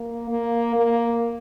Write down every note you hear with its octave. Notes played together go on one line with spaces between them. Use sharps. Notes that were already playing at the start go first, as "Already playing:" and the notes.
Already playing: A#3
A#3
A#3